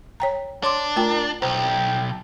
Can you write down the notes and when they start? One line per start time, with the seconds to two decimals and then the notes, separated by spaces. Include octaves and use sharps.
0.20 C#5 G5 A#5
0.63 D4 C#5 C6 D6
0.96 A3 F4 A#4 G5
1.42 B1 C5 G5